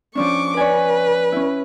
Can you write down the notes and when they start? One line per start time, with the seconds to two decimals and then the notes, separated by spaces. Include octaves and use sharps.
0.15 F3 C#4 D4 C#6 D6
0.57 B4 C#5 D5 G#5
1.32 C#4 E4